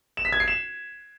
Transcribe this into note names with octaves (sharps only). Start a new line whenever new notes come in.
E7
B6
G#6
C7
E7